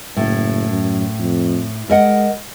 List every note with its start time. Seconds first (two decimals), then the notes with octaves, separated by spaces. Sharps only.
0.17 F#1 A2
0.70 F#2
1.19 F2
1.90 G#3 A#4 D#5 F#5